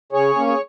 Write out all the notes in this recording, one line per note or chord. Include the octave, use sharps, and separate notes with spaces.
C#3 G#4 C#5
A#3 C#4
G#4